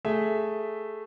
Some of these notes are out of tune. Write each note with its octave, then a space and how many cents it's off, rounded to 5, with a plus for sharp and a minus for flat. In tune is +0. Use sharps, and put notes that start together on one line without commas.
A3 +0 G#4 +0 E5 +0